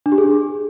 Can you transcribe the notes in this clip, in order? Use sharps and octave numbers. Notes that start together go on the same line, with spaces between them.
D4
G4
G#4